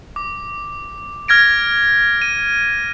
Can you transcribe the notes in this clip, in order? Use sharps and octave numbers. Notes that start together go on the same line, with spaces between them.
D6
F6 G#6 A#6 D7
D#7